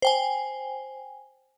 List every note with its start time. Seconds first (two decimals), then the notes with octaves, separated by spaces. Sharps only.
0.02 C5 G5 G#5